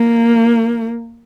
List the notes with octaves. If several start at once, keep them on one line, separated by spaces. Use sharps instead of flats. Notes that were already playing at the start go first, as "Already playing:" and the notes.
Already playing: A#3